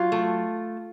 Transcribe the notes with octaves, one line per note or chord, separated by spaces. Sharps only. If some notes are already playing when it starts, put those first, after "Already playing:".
Already playing: F#3 F4
A3